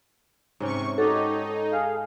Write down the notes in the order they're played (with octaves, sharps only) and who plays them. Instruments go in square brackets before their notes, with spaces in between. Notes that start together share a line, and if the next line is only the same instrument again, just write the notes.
[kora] G#2 C#4 G5 [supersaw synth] C3 C#6
[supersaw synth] D#4 [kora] F#4 [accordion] G4 C#5 [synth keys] A4
[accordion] G#4 F5